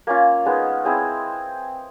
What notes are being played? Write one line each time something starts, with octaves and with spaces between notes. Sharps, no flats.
A#3 C#4 F4
G#3 B3 D#4
C4 E4 G#4